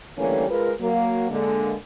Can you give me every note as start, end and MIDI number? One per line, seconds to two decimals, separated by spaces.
0.18 0.46 50
0.18 0.46 52
0.18 0.46 55
0.18 0.46 57
0.18 0.46 58
0.18 0.46 61
0.49 0.72 56
0.49 0.72 65
0.49 0.72 70
0.49 0.72 71
0.80 1.28 54
0.80 1.28 58
1.31 1.74 50
1.31 1.74 56
1.31 1.74 58